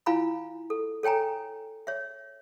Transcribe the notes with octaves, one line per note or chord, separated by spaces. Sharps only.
E4 F4 F5 G#5 A#5 B5
A4
A4 C#5 G5 G#5 A#5
C#5 E5